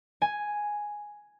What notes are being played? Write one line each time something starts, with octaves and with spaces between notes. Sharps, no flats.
G#5